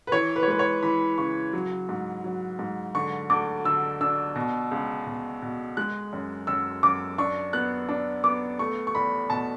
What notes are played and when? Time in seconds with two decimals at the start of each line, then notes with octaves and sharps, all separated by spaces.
0.07 B4
0.12 E3 C#5
0.36 B4
0.43 C#5
0.48 G#3 B4
0.59 C#5
0.83 E3 B5
1.18 C#3 C#6
1.53 F#3
1.89 G#2
2.24 F#3
2.59 G#2
2.95 D3 C#6
3.30 D2 D6
3.65 D3 E6
4.01 D4 E6
4.36 B2
4.71 C#2
5.07 B2
5.42 B2
5.77 G#3 F#6
6.13 F#2
6.47 F#2 E6
6.83 F#2 D6
7.18 D4 C#6
7.53 B3 F#6
7.89 D4
8.24 B3 D6
8.59 A3 C#6
8.87 C#6
8.95 E2 B5
9.30 B2 A5